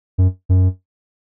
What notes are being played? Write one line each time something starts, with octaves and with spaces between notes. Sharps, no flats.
F#2
F#2